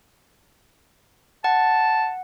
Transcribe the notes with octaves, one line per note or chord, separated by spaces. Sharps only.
F#5 A5